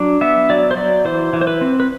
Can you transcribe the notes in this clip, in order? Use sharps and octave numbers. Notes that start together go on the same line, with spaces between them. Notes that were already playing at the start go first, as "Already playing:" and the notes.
Already playing: F#3 D4
B3 E5
F#3 D5
C5
F#3 D5
E3 C5
E3
C5
B4
C4
B4